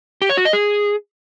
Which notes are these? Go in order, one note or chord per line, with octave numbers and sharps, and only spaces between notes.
G4
C#5
F#4
D#5
G#4